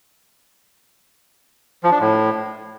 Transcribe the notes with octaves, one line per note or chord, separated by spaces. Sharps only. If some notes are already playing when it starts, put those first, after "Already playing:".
F3
D4
A2